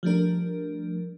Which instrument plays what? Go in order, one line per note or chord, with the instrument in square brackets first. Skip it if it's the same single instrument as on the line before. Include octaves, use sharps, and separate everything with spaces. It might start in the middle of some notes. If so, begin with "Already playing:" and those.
[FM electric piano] F3 G3 A3 D4 A#4